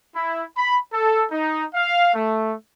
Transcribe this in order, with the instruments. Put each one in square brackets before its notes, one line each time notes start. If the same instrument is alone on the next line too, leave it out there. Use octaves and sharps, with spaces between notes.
[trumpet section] E4
B5
A4
D#4
F5
A3